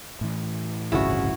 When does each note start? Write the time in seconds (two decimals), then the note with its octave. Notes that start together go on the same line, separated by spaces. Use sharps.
0.21 A2 E3
0.92 D1 G1 C2 C#3 E4 F#4